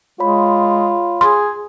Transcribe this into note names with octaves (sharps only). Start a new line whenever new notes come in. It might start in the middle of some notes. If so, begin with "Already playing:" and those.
G#3 F4 C#5 B5
G#4 C6